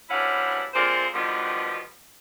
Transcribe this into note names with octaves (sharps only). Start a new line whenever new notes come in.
D2 G2 C#4 E4 F5 F#5
D3 G#3 A#3 C4 F4 C5
B2 D3 D#3 F3 G3 B3